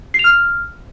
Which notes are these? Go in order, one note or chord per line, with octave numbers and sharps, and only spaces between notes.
C7
F7
F6